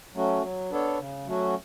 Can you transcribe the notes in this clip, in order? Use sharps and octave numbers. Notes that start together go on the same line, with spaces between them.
F#3 A3 C#4 F#4
F#3
B3 D4 A4 C#5
C#3
F#3 A3 C#4 F#4